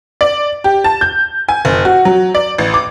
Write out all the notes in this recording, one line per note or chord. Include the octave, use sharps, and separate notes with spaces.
D5
G4
A5
G6
G#5
F#1
F#4
F#3
D5
A1
D6